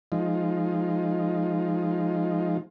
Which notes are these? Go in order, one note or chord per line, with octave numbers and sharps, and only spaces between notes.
F3 G#3 D#4 F4